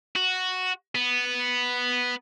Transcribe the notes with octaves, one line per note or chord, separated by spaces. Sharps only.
F#4
B3